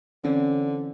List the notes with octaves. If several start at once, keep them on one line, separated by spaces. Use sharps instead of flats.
D3 E3 C4 C#4